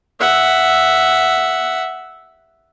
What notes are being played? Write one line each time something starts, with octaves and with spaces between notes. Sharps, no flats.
E5 F#5